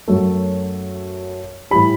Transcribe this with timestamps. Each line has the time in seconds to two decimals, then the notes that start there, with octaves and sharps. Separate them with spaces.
0.08 F#2 F#3 A3
1.71 A2 E3 G3 B5